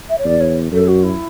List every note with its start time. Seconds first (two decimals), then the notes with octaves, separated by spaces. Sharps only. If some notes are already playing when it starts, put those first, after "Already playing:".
0.09 E5
0.18 C#5
0.25 E2 D5
0.40 C#5
0.72 F#2 A4
0.88 F#4
1.03 E4